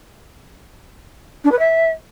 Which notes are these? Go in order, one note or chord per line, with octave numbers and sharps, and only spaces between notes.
D4
B4
E5